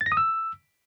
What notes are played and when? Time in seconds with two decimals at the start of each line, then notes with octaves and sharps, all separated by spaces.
0.01 A6
0.06 A#6
0.12 D#6
0.17 E6